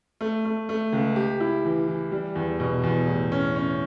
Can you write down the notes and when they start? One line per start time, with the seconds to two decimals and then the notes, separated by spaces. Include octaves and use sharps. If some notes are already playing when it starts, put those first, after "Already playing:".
0.21 A3
0.45 A3
0.69 A3
0.92 C#2
1.16 G4
1.40 E4
1.65 E3
1.88 E3
2.12 G3
2.35 E2
2.60 B2
2.83 E2
3.08 A2
3.32 C#4
3.56 C#4